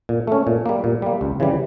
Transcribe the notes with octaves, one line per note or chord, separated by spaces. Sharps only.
A#2
A3 C#4
A#2
G3 A#3
A#2
G3 A#3
C#2
C#3 E3 G3